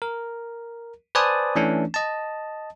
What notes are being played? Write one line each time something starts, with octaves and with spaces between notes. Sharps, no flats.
A#4
B4 C5 D5 G#5 A5 D#6
E3 A3 C#4 D4
D#5 A5